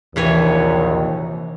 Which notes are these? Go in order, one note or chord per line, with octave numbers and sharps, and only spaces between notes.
A#1 D#2 C3 E3 C#5